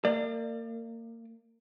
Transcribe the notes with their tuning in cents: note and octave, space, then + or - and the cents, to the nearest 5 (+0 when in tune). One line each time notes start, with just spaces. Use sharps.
A#3 -30 D5 +30